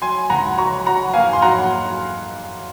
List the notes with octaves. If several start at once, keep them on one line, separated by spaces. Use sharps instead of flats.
F#3 G#5 C6
C#2 F#5 A#5
F#3 A#5 C#6
F#3 F#5 A#5
A#3 F5 G#5
C6
F#3 F#5 A#5